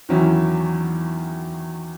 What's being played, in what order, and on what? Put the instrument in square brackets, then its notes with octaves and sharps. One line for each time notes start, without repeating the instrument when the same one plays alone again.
[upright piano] E2 D#3 F#3 C#4 E4 [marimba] E3